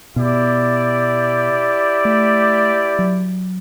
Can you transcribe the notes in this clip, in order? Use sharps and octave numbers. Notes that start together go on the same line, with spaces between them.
B2 E4 G4 D5
A3
F#3